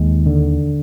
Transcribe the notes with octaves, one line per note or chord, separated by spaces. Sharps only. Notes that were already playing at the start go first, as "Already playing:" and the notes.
Already playing: D#2 G#3
D3